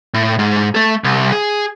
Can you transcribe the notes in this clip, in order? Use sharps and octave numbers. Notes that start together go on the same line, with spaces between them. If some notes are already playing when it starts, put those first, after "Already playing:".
A2
G#2
A3 A4
C2
G#4